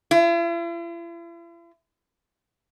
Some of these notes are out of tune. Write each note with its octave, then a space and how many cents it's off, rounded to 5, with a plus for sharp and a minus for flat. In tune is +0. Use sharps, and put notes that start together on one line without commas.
E4 +45